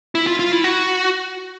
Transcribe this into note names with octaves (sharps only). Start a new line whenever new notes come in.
E4
F4
F4
E4
F#4